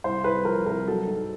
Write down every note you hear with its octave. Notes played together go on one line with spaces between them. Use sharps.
C2 C5
C2 B4
F3 A#4
C2 A#4
F#3 A4
G#2